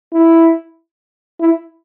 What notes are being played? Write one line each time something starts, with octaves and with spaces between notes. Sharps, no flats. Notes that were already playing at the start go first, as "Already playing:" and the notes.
E4
E4